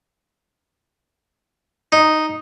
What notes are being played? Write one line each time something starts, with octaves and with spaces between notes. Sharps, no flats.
D#4